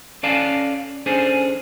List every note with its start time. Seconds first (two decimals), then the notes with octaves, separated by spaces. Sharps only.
0.23 C#4 A4 D5 F5 G#5 A5
1.06 C#4 D4 G#4 A4 C5